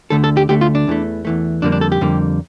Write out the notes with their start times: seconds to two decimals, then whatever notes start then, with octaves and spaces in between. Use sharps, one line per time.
0.10 D2 D3 A3 A4
0.24 A4
0.37 G4
0.49 D2 D3 A3 G4
0.61 F4
0.75 D4
0.87 E2 E3 A3
1.25 E2 E3 A3
1.62 F2 D3 G3 A#3 D4
1.72 D4
1.81 A4
1.92 G4
2.01 F2 D3 G3 A#3